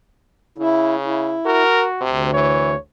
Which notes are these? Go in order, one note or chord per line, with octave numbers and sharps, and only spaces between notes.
C#3 E4
E4
F#4 A#4
D2 C3
E3 C#5